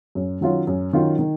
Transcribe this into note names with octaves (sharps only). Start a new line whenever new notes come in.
F#2
D#3 F#3 C#4 F4
F#2
D#3 F#3 C#4 F4
D#3